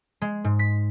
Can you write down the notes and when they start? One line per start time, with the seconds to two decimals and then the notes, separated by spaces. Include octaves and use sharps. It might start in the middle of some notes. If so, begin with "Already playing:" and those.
0.22 G#3
0.44 G#2
0.59 B6